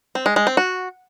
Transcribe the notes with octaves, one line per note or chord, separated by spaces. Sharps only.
C4
G#3
G#3
C4
F#4